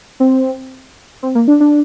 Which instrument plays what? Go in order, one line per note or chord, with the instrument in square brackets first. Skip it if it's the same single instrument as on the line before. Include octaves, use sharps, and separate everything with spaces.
[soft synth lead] C4
C4
A#3
D4
D4